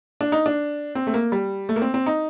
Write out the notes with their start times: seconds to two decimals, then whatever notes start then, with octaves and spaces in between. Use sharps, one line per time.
0.21 D4
0.32 D#4
0.46 D4
0.95 C4
1.07 A3
1.14 A#3
1.32 G3
1.69 A3
1.76 A#3
1.82 C4
1.94 C4
2.06 D#4